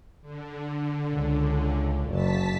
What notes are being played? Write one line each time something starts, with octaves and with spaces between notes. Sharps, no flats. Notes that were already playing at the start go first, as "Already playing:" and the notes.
D3
C#2
F#1 A5 B6